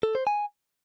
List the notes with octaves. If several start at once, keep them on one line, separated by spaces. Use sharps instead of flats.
A4
C5
G#5